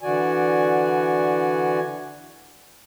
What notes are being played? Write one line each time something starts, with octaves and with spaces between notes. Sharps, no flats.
D3 E3 F#4 D5 G#5